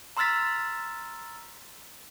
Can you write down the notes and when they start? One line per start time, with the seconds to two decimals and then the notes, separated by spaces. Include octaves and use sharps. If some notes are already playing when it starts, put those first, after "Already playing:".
0.17 A#5 C6 E6 F6 A6 B6